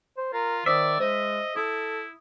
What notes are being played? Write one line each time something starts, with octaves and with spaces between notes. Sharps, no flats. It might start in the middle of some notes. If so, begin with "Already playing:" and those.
C5
F4 A#4
D#3 C5 D5 E5 D#6 E6
G#3 C5 D#5
E4 A4 D#6